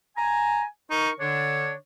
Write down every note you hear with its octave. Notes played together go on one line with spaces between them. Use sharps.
G#5 A#5
D#4 A#4 C#6
D3 D4 C#5